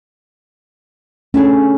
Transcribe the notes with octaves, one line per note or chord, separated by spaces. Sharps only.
A3 C#4 D4 G#4